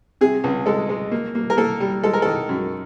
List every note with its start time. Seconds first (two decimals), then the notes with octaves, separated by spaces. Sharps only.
0.21 C3 G#4
0.44 C#2
0.66 G#3 A4
0.89 G#3
1.11 A#3
1.35 A#3
1.50 A#4
1.57 A#3 A4
1.80 G3
2.03 G#3 A4
2.13 A#4
2.22 D#3 A4
2.49 F#2